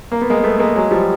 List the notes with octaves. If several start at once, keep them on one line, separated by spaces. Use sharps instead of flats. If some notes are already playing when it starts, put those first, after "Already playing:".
A#3
B3
G#3 A#3
A3 B3
G#3 A#3
F#3 G#3
F3 G3